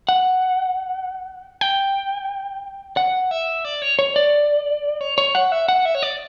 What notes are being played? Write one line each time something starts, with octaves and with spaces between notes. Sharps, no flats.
F#5
G5
F#5
E5
D5
C#5
C#5
D5
C#5
C#5
F#5
E5
F#5
E5
C#5
D5